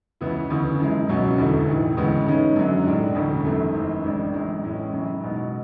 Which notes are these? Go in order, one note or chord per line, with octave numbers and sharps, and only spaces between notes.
C#2 C#3 E3 B3 E4
D2 C#3 E3
F#2 E3 G#3
C#2 B2 F#3 C#4 E4
E1 D2 D3 A3 E4
B1 A2 E3
D2 C#3 E3 G#3 B3
G#2 G#3 C#4
F#2 D3 F#3 C#4
B1 A2 G#3 D4
E1 D2 C#3
G#1 F#2 E3 A3
G#1 F#2 C#3
A1 A2 G#3 D4
F#2 E3 G#3
A2 G#3 C#4 E4
F#2 C#3 E3
B1 B2 G#3 B3